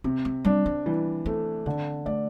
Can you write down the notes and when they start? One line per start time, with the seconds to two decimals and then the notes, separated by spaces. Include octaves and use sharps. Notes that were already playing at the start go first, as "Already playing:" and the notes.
0.04 C3 C4
0.25 C4
0.45 G3 D4
0.66 C4
0.86 E3 G3
1.26 A3 C4
1.66 D3 C4
2.06 A3 D5